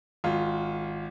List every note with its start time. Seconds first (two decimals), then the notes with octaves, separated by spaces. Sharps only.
0.24 G#1 F4